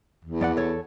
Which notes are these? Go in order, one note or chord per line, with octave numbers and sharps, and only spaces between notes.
E2
F2 D5 F#5
A4 C#5